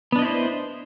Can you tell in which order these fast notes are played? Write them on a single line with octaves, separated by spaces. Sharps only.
B3 D4 D#5 E4 C5